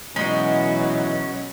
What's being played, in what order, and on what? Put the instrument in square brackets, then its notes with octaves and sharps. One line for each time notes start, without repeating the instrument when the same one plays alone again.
[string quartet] B2 F#3 [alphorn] E3 [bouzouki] G#3 D#4 [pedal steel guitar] C#4 F#4